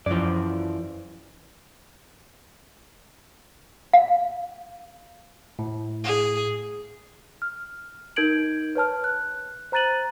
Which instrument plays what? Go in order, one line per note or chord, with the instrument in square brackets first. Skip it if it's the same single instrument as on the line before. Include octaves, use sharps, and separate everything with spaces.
[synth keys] F#2 F3 [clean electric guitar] E3 D5
[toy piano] F5
[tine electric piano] A2
[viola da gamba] G#4
[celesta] F6
D#4 A#4 G6 G#6 D7 F#7
B4 C#5 A5 F6
F#6
C5 A#5 F#6 A6 D#7 F#7